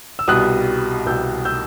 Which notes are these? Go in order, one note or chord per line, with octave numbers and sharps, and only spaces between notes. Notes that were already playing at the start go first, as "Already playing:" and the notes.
E6
C2 B2 G3 D#6 F#6
C2 B2 G3 E6 G6
E6 G6